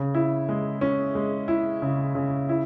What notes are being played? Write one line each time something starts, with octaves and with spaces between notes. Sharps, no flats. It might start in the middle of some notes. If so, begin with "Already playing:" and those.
Already playing: C#3
E4
G#3
C#4
G#3
E4
C#3
C#3
E4